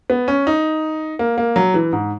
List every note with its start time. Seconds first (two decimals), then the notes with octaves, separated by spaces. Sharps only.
0.10 B3
0.28 C#4
0.47 D#4
1.19 A#3
1.38 A#3
1.56 F#3
1.74 E3
1.92 G#2